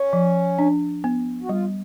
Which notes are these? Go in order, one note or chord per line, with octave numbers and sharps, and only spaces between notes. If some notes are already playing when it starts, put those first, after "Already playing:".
Already playing: C#4
F3
D4
B3
F#4
G3 F4